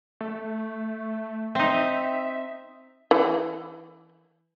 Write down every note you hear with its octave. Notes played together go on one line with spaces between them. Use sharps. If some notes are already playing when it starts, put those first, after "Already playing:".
A3
C4 D#4 E5
E3